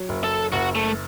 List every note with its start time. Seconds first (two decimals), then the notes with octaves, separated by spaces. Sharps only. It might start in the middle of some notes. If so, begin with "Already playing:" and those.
Already playing: F#3
0.09 F#1
0.24 A4
0.52 F#1 F#4
0.75 A3